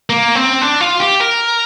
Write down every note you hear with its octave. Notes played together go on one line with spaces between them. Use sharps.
A#3
C4
D4
F4
G4
A#4